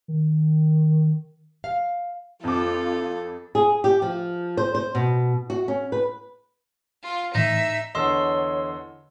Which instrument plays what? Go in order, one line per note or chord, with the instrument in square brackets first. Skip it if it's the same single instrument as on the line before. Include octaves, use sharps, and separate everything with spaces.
[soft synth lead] D#3
[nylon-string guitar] F5
[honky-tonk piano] F2 D6 [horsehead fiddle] F4 [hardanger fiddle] A4
[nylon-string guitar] G#4
G4
F3
C5
C5
B2
F#4
C#4
B4
[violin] F4
[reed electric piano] A2 E3 [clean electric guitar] D#4 [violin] E5
[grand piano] E2 D3 E3 [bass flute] C#5 [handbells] D#5 C6 E6